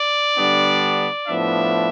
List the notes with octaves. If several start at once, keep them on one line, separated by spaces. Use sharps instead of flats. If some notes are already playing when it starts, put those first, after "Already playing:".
Already playing: D5
D3 G3 B3 D4
A2 F3 B3 D4 E5